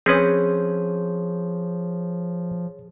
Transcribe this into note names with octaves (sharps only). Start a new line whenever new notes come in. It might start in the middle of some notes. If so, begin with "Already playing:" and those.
F3 C4 C#4 G#4 B4 C#5 C6 G6